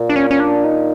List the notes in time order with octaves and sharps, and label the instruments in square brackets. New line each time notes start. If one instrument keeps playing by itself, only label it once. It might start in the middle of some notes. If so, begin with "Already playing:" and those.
Already playing: [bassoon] A#2
[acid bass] D4
C#4
C#4
D4
D#4